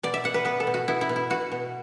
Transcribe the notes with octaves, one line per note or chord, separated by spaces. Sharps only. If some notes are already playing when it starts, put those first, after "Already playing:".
B2 D5
E5
B2 F#5
B4
B3 B4
A4
B2
F#4
B3 E4
E4
B2
E4
B2 F#4
B2